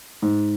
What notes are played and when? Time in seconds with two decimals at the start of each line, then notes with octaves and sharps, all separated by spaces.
0.22 G#2